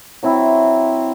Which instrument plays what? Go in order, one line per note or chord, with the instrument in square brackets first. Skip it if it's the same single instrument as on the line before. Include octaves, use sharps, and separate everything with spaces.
[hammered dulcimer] F#3 C4 E4